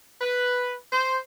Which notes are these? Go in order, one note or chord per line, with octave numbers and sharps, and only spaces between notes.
B4
C5